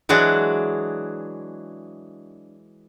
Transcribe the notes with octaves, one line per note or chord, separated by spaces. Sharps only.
E3 F#3 G#3 D4 F#4